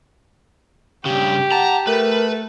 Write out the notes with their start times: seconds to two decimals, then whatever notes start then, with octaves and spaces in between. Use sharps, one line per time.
1.05 G2 C#3 G4
1.52 F#5 A5 A#5
1.87 A3 A#4 B4